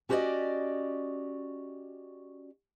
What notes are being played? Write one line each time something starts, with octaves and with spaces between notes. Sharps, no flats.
C#4 F#4 G4 C5 D5 D#5